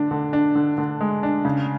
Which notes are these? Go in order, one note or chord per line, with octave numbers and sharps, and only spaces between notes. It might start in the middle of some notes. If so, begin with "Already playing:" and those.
Already playing: D3 D4
D3
D4
D3
D3
G#3
D4
C#3